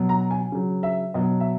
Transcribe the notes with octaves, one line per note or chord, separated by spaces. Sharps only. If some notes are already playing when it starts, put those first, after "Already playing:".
Already playing: B2 F#3
A#5
G#5
C#3 F#3
E5
B2 F#3 D#5
E5